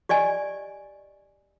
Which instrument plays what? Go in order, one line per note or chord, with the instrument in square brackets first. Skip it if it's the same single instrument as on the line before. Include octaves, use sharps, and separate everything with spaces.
[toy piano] G4 D5 D#5 G#5